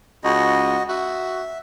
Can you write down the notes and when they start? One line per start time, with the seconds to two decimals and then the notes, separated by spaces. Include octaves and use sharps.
0.24 C#2 F#4 D#5
0.89 F#4 E5